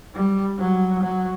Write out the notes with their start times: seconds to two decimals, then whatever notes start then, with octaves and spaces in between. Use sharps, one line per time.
0.15 G3
0.58 F#3
1.03 F#3